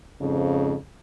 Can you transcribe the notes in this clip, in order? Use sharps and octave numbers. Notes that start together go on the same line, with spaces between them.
F2 G#2 C#3